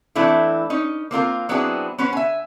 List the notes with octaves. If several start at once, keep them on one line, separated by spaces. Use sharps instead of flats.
E3 A3 C4 D4 E4
C#4 D#4
A#3 C4 F4 A#4
F#3 B3 C4 D4 E4 G#4
B3 C#4 B4 C5
E5 G#5